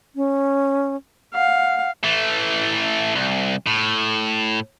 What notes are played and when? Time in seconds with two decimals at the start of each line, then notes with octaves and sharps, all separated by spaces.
0.16 C#4
1.35 F5 F#5
2.04 E3 A3
3.15 C2
3.67 A2